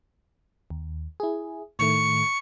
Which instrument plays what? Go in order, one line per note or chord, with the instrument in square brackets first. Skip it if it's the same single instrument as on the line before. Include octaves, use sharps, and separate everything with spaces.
[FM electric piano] D#2
E4 G#4
[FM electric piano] A2 D#3 A3 [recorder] C#6